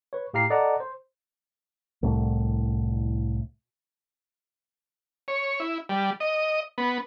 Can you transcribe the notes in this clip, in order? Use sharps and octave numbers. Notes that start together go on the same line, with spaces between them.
B4 C#5
A2 G4 F5 A#5 C7
A4 D5 D#5 F#5 A5 A#5
C5
C2 A2
C#5
E4
G3
D#5
B3